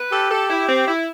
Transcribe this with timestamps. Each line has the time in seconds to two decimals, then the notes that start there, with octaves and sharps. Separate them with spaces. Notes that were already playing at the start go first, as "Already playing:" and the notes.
Already playing: B4
0.12 G4 A4
0.31 A4
0.50 E4
0.69 C4
0.88 E4